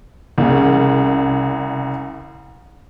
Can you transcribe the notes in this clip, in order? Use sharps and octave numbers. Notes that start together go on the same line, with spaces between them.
C2 C#3